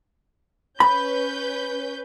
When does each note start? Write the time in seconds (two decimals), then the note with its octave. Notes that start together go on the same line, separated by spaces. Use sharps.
0.80 C#4 B4 B5 G6